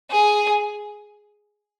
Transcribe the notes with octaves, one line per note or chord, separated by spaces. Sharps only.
G#4